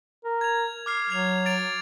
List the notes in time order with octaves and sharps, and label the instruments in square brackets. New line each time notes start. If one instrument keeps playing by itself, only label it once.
[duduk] A#4
[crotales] G#6 F7
D6 F6 C7
[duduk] F#3 [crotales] G#6 F7
[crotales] A6 D7 F7